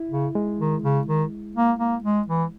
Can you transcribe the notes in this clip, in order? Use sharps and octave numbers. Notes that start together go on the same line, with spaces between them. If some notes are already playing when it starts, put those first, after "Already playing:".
Already playing: E4
C#3
G#3
D#3
C#3
D#3
A#3
A#3
G#3
E3